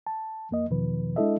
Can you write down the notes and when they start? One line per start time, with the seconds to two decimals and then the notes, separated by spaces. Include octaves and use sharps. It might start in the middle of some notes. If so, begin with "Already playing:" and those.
0.07 A5
0.51 F2 A#3 D#5
0.70 E2 B2 D#3 F3 B4
1.16 G#3 D4 E4 A4 D#5 E5